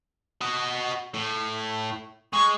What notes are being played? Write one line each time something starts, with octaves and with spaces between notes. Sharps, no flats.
F#4 D#5
A2
G#3 C#6